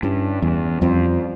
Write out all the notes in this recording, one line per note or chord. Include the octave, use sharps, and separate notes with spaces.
G2 G3 C#4 E4
E2
F2 G3 C4 F4 C5